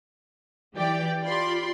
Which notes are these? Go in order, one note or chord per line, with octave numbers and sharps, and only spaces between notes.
E3 G4 D5 G5
F4 G4 D5 B5 C6